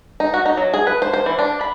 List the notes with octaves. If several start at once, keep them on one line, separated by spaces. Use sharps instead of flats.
D#4
F#4
D#4
F#3
G#4
B4
C5
C5
E3
D4
B5